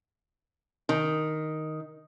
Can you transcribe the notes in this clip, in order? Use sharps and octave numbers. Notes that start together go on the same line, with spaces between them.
D#3